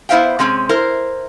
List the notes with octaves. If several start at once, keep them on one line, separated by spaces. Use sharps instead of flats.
B3 E4 C5 E5 F5 G5
C3 G#3 C4 C#4
E4 A#4 C5